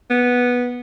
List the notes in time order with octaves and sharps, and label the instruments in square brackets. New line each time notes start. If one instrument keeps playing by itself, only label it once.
[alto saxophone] B3